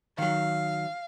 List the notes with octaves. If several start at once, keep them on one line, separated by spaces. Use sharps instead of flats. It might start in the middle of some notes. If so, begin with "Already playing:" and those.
D#3 F#3 F5